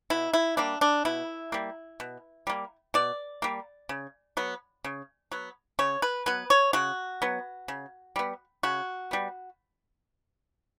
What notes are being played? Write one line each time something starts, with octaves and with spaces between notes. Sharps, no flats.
B2 E4
E4
G3 A#3 D4
D4
B2 E4
G3 A#3
B2
G3 A#3
B2 D5
G3 A#3
C#3
F#3 B3
C#3
F#3 B3
C#3 C#5
B4
F#3 B3 B4
C#5
C#3 F#4
F#3 B3
C#3
G3 B3
C#3 F#4
G3 B3